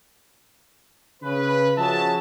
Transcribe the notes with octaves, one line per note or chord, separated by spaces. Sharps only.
C#3 B4
F3 C#4 F#4 G#4 E5 A5